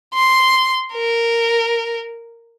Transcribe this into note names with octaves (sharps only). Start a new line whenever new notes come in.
C6
A#4